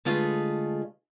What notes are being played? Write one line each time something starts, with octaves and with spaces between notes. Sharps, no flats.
D3 G#3 A3 F4 G#4 B4